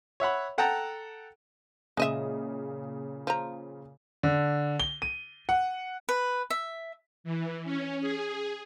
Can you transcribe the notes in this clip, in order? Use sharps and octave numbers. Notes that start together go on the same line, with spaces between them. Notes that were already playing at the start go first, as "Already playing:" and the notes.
C#5 E5 F#5 B5
A4 F#5 G5 A5 A#5
A#2 C#3 G#3 D#5 E5 D#6
F3 A#5
D3
G7
D#7
F#5
B4
E5
E3
C#4
G#4